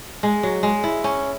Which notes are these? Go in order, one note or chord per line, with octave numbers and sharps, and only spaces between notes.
G#3
F#3
G#3
E4
C#4